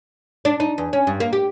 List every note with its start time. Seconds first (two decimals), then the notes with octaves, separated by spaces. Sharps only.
0.45 D4
0.60 D#4
0.78 E2
0.93 C#4
1.07 G2
1.20 A#3
1.33 G4